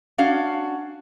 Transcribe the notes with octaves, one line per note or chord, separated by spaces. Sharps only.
C#4 D4 F#4 F5